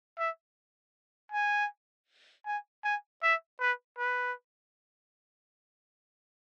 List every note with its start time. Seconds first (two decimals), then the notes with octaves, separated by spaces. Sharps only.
0.19 E5
1.32 G#5
2.46 G#5
2.84 G#5
3.23 E5
3.60 B4
3.98 B4